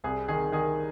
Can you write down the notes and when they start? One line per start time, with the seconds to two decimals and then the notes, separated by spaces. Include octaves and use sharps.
0.04 C2 G#4
0.28 D#3 G#4
0.52 D#3 G#4